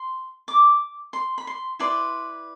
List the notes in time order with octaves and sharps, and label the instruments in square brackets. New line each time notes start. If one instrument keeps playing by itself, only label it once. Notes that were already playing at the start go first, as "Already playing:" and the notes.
Already playing: [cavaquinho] C6
D6
C6
B5
C6
E4 B4 D5 C6